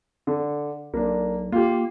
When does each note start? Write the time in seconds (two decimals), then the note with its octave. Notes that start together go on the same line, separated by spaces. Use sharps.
0.27 D3
0.94 B1 A#3 D4
1.52 A#3 F4 G4